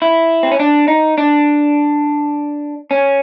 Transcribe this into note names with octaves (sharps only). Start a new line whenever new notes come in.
E4
C4
C#4
D4
D#4
D4
C#4